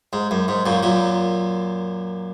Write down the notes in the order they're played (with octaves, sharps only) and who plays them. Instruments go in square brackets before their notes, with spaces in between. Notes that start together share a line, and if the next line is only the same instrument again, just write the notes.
[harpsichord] G#2
F#2
G#2
F#2 A#2
F#2 A#2